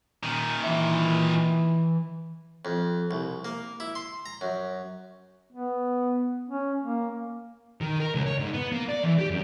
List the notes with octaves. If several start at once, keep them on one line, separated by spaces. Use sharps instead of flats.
A#2 D#3
E3 E5
F2
C2
A#3
E4
C6
A#5
F#2
B3
C#4
A#3
D#3
A#4
C#2
C#5
G#2
B3
A#3
D5
E3
G4
F#2